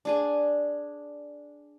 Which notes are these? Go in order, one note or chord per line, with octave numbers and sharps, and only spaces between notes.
D4 G#4 G#5